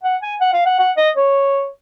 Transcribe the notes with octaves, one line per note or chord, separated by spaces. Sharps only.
F#5
G#5
F#5
F5
F#5
F#5
D#5
C#5